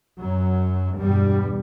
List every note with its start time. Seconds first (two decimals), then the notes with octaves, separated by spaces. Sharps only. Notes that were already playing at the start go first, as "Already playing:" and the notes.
0.20 F#2 F#3
0.99 E2 G2 B2 G3